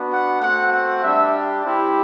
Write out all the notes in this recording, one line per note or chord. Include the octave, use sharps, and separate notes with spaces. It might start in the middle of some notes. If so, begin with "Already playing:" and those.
Already playing: B3 D4 F#4
F#5
A3 C4 F#4 F#5
F#5
G3 D4 G4 E5
G3 C4 E4 G4